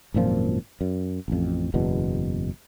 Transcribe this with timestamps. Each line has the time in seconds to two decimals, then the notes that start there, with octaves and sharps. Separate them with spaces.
0.14 G#1 F#2 A#2 F3
0.81 F#2
1.28 A1 F2
1.74 F#1 E2 B2